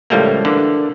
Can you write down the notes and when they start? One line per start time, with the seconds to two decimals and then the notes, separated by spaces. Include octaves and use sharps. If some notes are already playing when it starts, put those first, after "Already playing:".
0.10 C#2 A2 F3 G3 A3 A#3
0.45 D3 E3 A#3